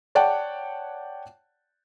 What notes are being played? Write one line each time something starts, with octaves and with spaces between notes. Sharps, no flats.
C#5 D5 F#5 G5 A5